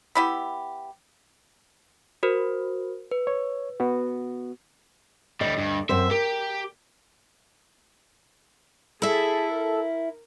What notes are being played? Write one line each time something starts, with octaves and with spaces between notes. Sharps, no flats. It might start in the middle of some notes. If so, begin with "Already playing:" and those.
B3 E4 G4
F#4 A#4 C5
B4
C#5
B3 F#4
D2 A2 G3 D#5
G2
F#2 C4 C5 E5
G4 A#4
E4 G#4 A4 E5
A#4